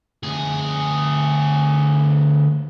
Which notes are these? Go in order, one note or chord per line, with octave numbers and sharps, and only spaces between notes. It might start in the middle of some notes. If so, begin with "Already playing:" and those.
D2 G#4